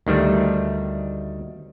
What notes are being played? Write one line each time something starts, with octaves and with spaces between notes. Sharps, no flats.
D2 D#3 G3 A3